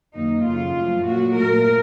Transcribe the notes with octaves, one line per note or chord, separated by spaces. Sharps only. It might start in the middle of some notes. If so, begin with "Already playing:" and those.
F#2 D#3 A#3 D#4
F#2 C#3 A3 F4
F#2 F3 A3
A#2 F#3 A3 F#4
A#2 A3 A#4